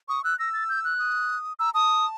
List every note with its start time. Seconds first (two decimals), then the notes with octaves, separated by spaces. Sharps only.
0.08 C#6 D#6
0.24 E6 F#6
0.39 E6 A#6
0.53 A6
0.69 G6
0.84 F#6
0.99 D#6
1.59 A#5 E6
1.74 A5 D#6